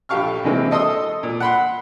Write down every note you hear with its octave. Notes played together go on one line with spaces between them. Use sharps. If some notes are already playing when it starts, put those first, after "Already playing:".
A#1 G4 A4 F5 C#6 F6
C3 E3 G#3 A#3 C4
A4 D#5 C6 D#6 E6
A#2
F#5 B5 C6